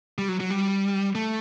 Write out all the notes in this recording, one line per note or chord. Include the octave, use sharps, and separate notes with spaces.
G3
F#3
F#3
G3
A3